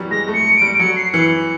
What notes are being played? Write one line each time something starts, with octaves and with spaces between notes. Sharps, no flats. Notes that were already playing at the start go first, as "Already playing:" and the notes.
Already playing: E3 F#3 G3
G#3 A#6
A3
C#7
D7
G3
F#3 C#7
C7
E3 C#7